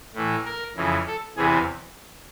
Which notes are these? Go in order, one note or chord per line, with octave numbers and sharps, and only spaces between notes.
A2 E3
A#4
F2 C#3 E3
A4
E2 C3 E3 G#4